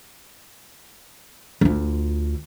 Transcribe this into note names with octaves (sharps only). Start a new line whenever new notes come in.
D2 F4